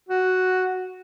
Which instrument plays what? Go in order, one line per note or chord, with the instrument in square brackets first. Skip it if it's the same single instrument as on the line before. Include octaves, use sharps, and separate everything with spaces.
[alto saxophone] F#4